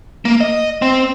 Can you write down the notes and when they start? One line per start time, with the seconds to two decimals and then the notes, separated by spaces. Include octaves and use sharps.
0.25 A#3
0.41 D#5
0.82 C4